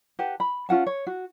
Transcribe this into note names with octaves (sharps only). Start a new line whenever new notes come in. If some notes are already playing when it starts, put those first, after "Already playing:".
G4 B4 F#5 A5
B5
C#4 F4 F#5 A5
C#5
F#4